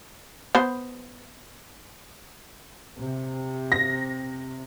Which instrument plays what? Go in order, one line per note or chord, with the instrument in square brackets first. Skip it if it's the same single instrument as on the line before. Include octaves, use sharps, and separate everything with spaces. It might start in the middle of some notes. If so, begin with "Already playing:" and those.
[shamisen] B3 C5
[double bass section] C3
[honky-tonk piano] A#6